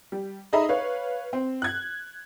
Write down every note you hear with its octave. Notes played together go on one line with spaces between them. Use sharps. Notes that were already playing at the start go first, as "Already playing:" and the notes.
G3
D#4 G#4 D#5 E5 A#5 B5
B4 C#5 F5
C4
F#6 G#6